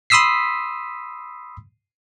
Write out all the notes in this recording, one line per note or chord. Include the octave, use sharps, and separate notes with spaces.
B5 C6 D#6 E6 B6 C7